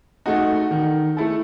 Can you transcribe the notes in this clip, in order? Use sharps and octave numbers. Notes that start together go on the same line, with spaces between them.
A3 D#4 F#4
D#3
A3 E4 A4